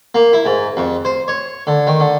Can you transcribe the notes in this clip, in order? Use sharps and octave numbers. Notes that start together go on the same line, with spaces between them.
A#3
E4
G#2
F2
C5
C#5
D3
D#3
D3